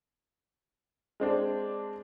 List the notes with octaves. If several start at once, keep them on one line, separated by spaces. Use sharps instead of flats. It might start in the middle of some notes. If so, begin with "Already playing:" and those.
G#3 C4 D4